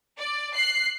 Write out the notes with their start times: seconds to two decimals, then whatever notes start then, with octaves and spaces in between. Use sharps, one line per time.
0.18 D5
0.54 F#6 C7